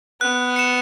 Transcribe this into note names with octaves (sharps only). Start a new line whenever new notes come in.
B3 F#6
C#7 E7